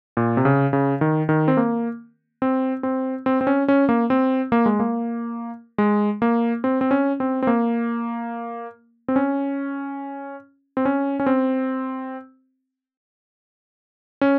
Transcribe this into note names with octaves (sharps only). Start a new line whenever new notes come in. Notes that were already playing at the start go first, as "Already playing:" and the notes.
A#2
C3
C#3
C#3
D#3
D#3
C4
A#3
C4
C4
C4
C4
C#4
C#4
A#3
C4
A#3
G#3
A#3
G#3
A#3
C4
C4
C#4
C4
C4
A#3
C4
C#4
C4
C#4
C#4
C4
C#4